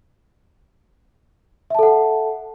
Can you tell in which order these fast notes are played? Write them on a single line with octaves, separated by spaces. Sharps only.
E5 A5 A4 F#5